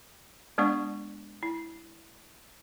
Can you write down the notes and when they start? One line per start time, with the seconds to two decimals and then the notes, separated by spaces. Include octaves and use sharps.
0.58 G#3 B3 D4 D5 F#5 C#6
1.43 E4